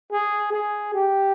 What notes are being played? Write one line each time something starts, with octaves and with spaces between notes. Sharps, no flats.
G#4
G#4
G4